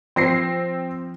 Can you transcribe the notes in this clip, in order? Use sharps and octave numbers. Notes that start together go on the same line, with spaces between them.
F3 C4 A#6 C7